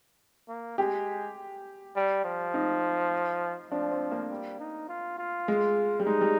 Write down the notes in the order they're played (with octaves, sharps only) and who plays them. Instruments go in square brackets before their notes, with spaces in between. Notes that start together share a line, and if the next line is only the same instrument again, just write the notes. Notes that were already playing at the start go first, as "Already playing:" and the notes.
[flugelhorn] A#3
[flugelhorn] G#3 [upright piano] G4
[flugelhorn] G3
F3
[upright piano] D#4
[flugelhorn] F3 [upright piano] D4
[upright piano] C4
A#3
[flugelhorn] G3
D#4
F4
F4
[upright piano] G#3
G3
[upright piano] G#3 [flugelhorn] D#4
[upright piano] G3